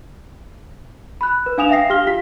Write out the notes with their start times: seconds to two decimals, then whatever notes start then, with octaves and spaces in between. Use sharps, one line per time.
1.21 B5 F#6
1.46 B4
1.58 D4 F5 G#5 D#6 E7 F7
1.69 E5 F5 G5 A#6 C7
1.90 G4 F5 F6 G7
2.07 F4 B6